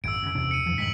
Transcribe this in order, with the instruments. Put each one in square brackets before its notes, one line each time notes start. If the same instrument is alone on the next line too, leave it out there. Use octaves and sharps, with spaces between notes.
[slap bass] G#1 F#2 [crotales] E6 D7
[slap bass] F#2 C#3
E2 C3 D4
[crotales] C#7 D#7
[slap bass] F2 E3 F3
[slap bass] G#2 D#3 G3 [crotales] B6 F#7